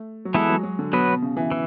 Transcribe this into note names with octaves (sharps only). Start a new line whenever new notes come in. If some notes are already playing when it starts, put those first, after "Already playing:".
Already playing: A3
F#3
E3 G#3 B3 E4 A4
F#3
F#3
D3
B2 F#3 B3 F#4 B4
B2
C#3
E3
E3